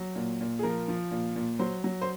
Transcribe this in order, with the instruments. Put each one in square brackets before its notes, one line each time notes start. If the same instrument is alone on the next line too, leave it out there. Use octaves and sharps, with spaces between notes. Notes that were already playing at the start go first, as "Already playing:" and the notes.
Already playing: [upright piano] F#3
A#2
A#2
G#4
F3 A#4
F3
A#2
A#2
F#3 C5
F#3
C5